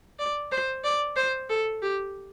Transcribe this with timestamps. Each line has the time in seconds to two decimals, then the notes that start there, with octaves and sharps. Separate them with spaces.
0.19 D5
0.52 C5
0.84 D5
1.16 C5
1.49 A4
1.82 G4